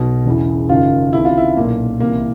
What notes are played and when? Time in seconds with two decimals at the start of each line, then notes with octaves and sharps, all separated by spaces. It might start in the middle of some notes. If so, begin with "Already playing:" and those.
Already playing: B1 B2
0.25 E1 E2 C#3 E3
0.69 F#1 F#2 D#3 F4
1.13 C#2 C3 D#3 E4
1.25 F4
1.38 E4
1.57 B1 A#2 A#3
2.00 C2 C3 E3 A#3